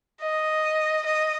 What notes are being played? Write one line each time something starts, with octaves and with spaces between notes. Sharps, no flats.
D#5
D#5